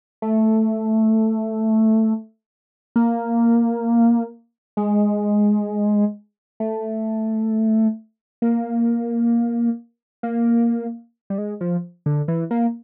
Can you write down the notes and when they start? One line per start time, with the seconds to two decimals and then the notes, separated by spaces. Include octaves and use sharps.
0.22 A3
2.96 A#3
4.77 G#3
6.60 A3
8.42 A#3
10.23 A#3
11.30 G3
11.38 G#3
11.61 F3
12.06 D3
12.28 E3
12.51 A#3